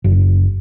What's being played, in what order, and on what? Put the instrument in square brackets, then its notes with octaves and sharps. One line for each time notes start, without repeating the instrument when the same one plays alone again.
[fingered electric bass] F#1